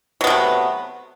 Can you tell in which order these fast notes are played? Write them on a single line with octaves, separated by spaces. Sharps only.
F#3 B3 C3 A3